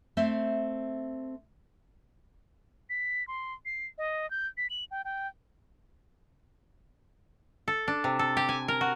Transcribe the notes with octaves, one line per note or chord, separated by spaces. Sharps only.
A3 C4 C5 E5
B6
C6
C7
D#5
G6
B6
F#7
G5
G5
A4
D4
C3
A4
G4
G#5
A#4
F#4